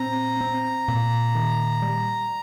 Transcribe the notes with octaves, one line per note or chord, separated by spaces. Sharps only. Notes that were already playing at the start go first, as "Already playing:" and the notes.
Already playing: A#2 C4 A#5
C4
A#2
D#3
G3